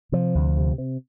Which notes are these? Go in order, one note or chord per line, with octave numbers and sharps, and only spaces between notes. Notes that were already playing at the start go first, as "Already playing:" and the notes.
C3 F3
D2
C3
C3